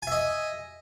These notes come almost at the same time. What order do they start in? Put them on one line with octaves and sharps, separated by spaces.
G#5 E5 D#5